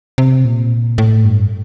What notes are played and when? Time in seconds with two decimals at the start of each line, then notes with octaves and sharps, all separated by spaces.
0.18 C3
0.45 A#2
0.98 A2
1.25 G2